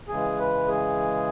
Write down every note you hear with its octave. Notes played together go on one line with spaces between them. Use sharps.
C#3 E3 G#3 G#4
B4
G#4